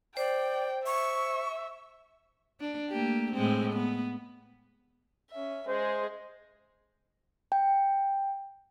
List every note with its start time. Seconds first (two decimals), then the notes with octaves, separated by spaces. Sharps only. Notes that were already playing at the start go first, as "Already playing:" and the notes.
0.17 C5 D5 G5
0.86 E5 C#6
2.60 D4
2.90 A3 A#3 G4
3.33 A2 G#3 C4
3.73 B3
5.31 C#4 E5
5.68 G#3 G#4 C5
7.52 G5